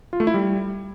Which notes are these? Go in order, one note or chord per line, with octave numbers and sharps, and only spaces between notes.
F4
A3
E4
G3